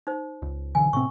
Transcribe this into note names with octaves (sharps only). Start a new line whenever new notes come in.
D#4 C5
C#2
B1 D3 E3 G#5
A2 C3 C4 C#6